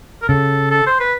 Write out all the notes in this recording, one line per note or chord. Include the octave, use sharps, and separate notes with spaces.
A#4
C#3 A4
A4
C5
B4